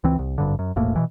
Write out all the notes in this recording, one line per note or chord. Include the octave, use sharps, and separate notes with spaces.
C#2 E3 C4
C2
G#1 G2 D3
F#2
E1 A#1 A2 A#3
B2 D3 E3